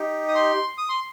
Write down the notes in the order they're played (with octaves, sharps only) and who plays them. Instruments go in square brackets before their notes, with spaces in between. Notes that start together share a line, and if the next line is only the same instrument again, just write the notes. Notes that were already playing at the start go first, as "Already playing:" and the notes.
Already playing: [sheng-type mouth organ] D#4 G4
D#6
C6
D#6
C6